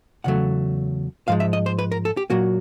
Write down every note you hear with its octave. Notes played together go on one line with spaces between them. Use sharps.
E2 C#3 F#3 A3 F#5
G#2 F3 G#3 F5
E5
D#5
C5
B4
A#4
A4
G4
A#2 F#3 A#3 F#4